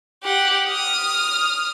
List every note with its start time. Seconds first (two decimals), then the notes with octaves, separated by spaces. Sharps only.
0.24 G4 F#5
0.69 D#6 F6